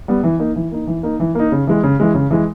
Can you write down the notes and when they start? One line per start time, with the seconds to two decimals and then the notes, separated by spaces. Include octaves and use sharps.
0.08 G3 B3
0.24 E3
0.39 A#3 D#4
0.56 E3
0.72 A#3 D#4
0.87 E3
1.03 A#3 D#4
1.20 E3
1.35 A#3 D#4
1.52 C#3
1.67 E3 G#3
1.83 C#3
2.00 E3 G#3
2.15 C#3
2.30 E3 G#3